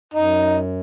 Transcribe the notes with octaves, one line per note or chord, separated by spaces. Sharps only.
F#2 D#4